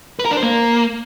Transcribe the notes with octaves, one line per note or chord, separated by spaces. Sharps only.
B4
A#4
D4
C5
A#3